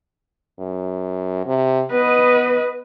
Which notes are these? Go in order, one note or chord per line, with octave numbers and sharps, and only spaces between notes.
F#2
C3
B3 B4 D#5